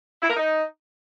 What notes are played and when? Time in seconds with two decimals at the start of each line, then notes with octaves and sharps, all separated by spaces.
0.22 E4
0.29 A#4
0.37 D#4